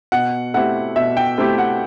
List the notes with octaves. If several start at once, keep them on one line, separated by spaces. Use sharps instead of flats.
B2 F#5
A3 C4 E4 G4 F#5
B2 E5
G5
A3 C4 E4 G4
F#5